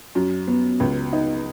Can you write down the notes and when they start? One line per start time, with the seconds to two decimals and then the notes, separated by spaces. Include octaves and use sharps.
0.15 F#2
0.48 B3
0.80 C#2
1.13 D#4